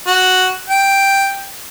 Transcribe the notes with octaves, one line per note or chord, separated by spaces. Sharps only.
F#4
G5